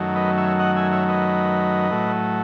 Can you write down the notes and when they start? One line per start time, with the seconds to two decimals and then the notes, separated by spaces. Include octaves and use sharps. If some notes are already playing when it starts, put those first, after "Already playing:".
Already playing: F#2 D#3 F#3 A3
0.15 B4 D#5
0.37 C#5 E5
0.59 D#5 F#5
0.76 E5 G#5
0.92 C#5 E5
1.09 B4 D#5
1.91 A2 F#3 A3